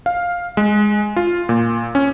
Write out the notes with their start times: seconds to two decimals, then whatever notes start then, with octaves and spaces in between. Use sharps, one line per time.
0.06 F5
0.57 G#3
1.16 F4
1.49 A#2
1.95 C#4